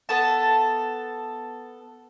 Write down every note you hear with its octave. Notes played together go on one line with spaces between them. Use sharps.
B3 A4 A5